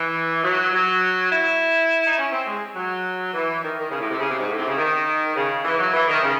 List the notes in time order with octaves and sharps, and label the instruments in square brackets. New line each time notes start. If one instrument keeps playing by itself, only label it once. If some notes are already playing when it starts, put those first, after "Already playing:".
Already playing: [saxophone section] E3
F#3
F#3
E4
D#4
C#4
C4
G#3
F#3
E3
D#3
D#3
C#3
A2
C3
C#3
C3
G#2
A2
C3
C#3
D#3
C#3
E3
F#3
E3
D#3
C#3